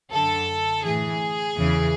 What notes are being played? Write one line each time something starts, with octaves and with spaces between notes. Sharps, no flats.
F#2 D3 A4
A2 E3 G#4
E2 C#3 E3